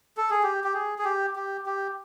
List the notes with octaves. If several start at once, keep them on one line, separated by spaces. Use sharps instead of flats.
A4
G#4
G4
G4
G#4
G#4
G4
G4
G4